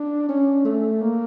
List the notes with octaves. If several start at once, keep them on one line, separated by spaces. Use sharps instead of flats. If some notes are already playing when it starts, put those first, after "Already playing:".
Already playing: D4
C#4
A3
A#3